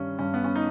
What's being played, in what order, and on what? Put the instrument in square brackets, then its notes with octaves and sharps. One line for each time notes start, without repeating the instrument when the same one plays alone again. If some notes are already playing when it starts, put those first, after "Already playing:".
Already playing: [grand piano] G2 D#3 G3 C#4
G2 C#4
B3
C#4
D#4